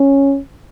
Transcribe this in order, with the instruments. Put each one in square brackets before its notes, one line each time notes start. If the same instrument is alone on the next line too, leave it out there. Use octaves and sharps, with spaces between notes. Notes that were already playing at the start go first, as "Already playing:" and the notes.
Already playing: [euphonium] C#4